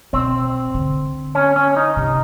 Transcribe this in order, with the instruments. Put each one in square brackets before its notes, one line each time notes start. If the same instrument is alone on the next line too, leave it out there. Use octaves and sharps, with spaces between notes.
[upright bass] B2 [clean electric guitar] C4
[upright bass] D3
[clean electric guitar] C#4
C#4
D#4
[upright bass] C3